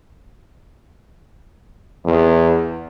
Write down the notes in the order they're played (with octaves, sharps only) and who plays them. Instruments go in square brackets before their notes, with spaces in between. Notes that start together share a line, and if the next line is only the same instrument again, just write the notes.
[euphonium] E2